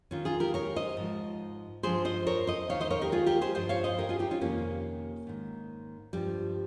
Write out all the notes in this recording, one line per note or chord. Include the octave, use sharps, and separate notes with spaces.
D#2 D#3 C#4 F4
F4 G#4
G4 A#4
A#4 C#5
C5 D#5
G#2 F3
G2 F3 G#4 C5
C5 D#5
A#4 C#5
C5 D#5
D#2 D#3 C#5 F5
C5 D#5
A#4 C#5
G4 A#4
F4 G#4
G4 A#4
G#4 C5
G2 F3 C5 D#5
C#5 F5
C5 D#5
G4 A#4
F4 G#4
D#4 G4
C#4 F4
F2 C3 D#3 A#3 C#4
G#2 D#3
G2 F3 G3